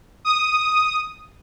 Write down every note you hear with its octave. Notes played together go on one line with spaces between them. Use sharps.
D#6